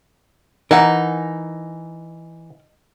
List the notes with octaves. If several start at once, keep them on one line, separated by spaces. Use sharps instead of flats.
E3 D#4 A#4 F#5